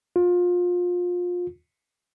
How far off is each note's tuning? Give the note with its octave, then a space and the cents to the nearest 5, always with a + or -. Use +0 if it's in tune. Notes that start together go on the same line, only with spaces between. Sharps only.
F4 +25